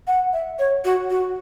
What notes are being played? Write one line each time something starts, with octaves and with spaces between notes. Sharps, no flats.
F#5
E5
C#5
F#4
F#4